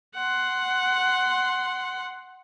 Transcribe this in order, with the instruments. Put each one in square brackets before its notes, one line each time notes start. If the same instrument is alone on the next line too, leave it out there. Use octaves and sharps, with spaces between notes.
[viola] F#5 C6